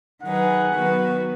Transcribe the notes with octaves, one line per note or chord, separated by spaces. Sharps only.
D#3 F#3 D#4 G#4 B4 F#5
D#3 F#3 B3 F#4 B4